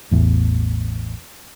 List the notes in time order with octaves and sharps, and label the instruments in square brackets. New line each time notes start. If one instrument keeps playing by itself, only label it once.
[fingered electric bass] A1 E2 A2